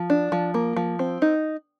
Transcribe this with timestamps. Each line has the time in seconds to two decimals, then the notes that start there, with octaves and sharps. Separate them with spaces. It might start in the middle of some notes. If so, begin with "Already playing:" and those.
Already playing: F3
0.10 D4
0.32 F3
0.54 A#3
0.77 F3
0.99 C4
1.22 D#4